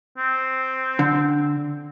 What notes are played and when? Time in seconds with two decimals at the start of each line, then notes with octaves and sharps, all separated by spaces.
0.18 C4
0.99 D3